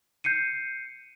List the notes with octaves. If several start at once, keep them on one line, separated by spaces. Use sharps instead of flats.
G6 C7 C#7 D#7